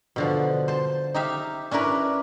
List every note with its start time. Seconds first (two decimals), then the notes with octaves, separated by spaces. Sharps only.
0.16 B2 D3 F3
0.68 C5 A5
1.14 D#4 G4 E5 F5
1.71 C#4 D4 E4 A#4 B4